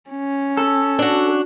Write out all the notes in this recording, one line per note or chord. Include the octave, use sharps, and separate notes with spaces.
C#4
A4
D4 F#4